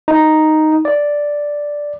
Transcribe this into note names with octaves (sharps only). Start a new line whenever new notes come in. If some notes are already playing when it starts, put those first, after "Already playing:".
D#4
D5